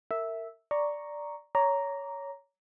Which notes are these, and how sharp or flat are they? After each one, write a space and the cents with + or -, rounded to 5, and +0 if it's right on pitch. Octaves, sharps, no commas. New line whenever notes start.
A#4 -30 E5 -5
D5 +0 A#5 +0 C#6 +0
C#5 +15 A#5 +0 D6 -20